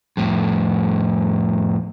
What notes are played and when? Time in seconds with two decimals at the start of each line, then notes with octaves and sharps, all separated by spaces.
0.17 F2 A2